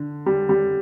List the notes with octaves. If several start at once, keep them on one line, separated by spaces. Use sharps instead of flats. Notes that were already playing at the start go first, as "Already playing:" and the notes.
Already playing: D3
G3
G3